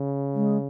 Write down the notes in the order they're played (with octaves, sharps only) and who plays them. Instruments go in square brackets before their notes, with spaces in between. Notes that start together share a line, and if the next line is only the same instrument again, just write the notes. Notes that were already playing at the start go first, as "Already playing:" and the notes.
Already playing: [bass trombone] C#3
[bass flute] G#3